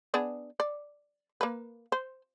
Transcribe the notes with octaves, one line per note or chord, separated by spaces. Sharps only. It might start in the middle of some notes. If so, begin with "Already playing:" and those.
B3 D4 G#4
D5
A#3 B4
C5